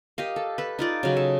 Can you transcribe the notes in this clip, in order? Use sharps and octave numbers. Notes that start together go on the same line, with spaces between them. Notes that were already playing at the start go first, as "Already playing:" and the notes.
G4 A#4 D#5 F5
A4
A4 B4
D#4 F4 D5
C#3 F#3
A4